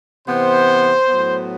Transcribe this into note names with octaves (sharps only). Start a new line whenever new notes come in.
C3 E3 B3 C5
A2 F#3 B3